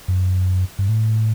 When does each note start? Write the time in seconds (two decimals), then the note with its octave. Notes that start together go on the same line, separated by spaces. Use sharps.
0.08 F#2
0.79 G2
0.89 A2